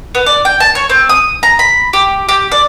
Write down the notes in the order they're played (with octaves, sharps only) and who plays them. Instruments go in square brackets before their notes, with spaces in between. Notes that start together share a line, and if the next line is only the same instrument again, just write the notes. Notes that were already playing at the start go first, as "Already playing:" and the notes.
[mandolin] B3
D5
G5
A5
C#5
C4
D#6
A#5
B5
G4
G4
D5